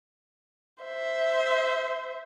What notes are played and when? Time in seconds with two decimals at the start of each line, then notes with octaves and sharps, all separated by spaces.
0.83 C5 E5